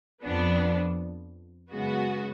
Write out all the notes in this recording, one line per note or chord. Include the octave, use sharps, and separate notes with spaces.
F2 F3 B3 D4
F#2 C#3 G#3 B3 F#4